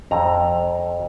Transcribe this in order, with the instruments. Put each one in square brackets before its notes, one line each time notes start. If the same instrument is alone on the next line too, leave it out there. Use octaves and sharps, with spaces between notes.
[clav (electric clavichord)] F2 A#5